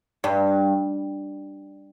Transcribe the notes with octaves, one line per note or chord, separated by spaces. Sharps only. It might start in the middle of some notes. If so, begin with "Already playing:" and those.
G2